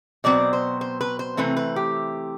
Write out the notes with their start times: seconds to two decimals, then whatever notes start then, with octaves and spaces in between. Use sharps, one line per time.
0.24 B2 F#3 C4 D5
0.53 C5
0.81 C5
1.01 B4
1.19 C5
1.37 C3 E3 A3 C4 B4
1.57 B4
1.76 G4